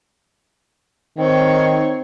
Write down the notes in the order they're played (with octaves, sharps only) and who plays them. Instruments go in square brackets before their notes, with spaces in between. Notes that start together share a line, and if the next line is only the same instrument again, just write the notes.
[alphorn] D#3 [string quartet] C4 C#5